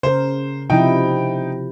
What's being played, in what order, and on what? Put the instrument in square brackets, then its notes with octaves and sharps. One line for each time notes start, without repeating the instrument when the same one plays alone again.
[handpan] C#3 A#4 [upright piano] C5
[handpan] C3 F3 E4 [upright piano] D#4 G5